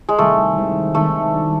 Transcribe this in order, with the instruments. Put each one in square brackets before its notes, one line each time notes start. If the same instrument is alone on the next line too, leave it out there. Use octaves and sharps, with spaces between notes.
[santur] G#3
[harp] C3 D#3 G3 C4 E4 [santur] A3
[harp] D#3 G#3 C4 E4
[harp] D#3 G#3 C4 E4 [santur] A3
[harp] G3 B3 D4 F#4